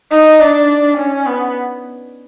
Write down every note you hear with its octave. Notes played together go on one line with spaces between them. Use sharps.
D#4
D4
C#4
B3